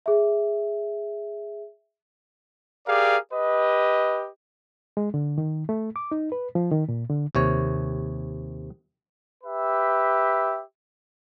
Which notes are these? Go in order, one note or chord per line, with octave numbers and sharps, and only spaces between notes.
G#4 E5
G4 G#4 A#4 D5 F5
G4 B4 D#5
G#3
D3
D#3
A3
D6
D#4
B4
F3
D#3
A#2
D3
D#2 C3 C#5
G4 B4 E5